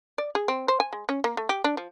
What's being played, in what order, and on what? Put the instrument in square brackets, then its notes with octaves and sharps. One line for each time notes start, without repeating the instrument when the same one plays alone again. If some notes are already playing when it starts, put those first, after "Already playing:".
[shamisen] D5
G#4
C4
C5
G#5
G#3
C#4
A#3
A3
G4
D4
F3